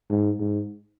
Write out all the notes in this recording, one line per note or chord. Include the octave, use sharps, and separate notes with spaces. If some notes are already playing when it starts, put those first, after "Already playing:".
G#2
G#2